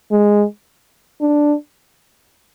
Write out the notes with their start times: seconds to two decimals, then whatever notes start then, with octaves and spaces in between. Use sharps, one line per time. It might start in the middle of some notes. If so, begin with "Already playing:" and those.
0.11 G#3
1.21 D4